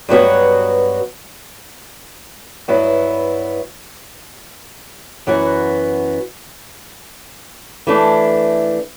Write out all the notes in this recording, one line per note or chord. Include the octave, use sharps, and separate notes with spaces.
G2 F#3 B3 F#4
G2 F#3 B3 E4
F#2 E3 B3 F#4
E3 A3 D4